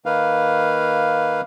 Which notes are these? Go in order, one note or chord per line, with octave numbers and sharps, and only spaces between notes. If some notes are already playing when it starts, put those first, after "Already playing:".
D#3 A#3 B4 F5